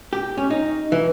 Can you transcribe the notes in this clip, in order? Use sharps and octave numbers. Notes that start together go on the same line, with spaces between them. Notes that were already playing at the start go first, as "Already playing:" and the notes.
G4
C#4
D#4
E3